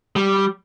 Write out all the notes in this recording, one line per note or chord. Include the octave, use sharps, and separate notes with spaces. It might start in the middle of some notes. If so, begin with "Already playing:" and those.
G3